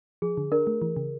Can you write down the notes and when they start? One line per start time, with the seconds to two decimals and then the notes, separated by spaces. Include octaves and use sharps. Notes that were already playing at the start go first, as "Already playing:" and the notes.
0.22 F3 G#4
0.37 D3
0.52 D4 A#4
0.67 A3
0.82 E3
0.96 C#3